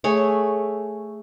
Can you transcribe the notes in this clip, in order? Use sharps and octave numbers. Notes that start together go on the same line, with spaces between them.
A3 G#4 C#5